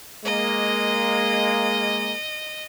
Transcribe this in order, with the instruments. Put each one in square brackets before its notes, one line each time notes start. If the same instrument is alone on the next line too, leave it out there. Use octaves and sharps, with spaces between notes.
[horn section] G#3 A#3 [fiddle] D#5